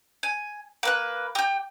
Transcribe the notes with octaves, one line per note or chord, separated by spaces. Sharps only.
G#5
A#3 B4 F#6
G4 G5